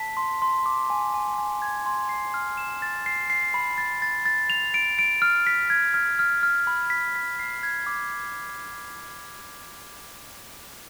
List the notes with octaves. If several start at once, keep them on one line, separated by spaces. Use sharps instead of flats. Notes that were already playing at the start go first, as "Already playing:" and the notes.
Already playing: A5 B6
C6
C6
D6
G#5
G#5
G#5
G#6
C6
C7
F6
E7
A6
C7
C7
B5
A6
A6
A6
F7
D7
D7
F6
B6
G#6
F6
F6
F6
B5
B6
B6
C7
G#6
D6